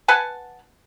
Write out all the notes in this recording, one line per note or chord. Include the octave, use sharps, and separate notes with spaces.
B4 F#5 G#5 A5